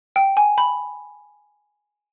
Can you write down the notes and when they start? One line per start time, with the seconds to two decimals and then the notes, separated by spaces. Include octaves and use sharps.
0.16 G5
0.37 G#5
0.58 B5